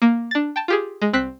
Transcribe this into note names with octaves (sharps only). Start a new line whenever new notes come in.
A#3
D4 A6
G5 A5
F4 G4 G#4
G#3
C2 C4 F#6 B6